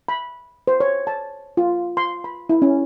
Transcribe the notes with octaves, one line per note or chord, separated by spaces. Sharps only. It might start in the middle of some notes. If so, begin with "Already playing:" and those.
B5
C5
C#5
A5
F4
C6
B5
E4
C#4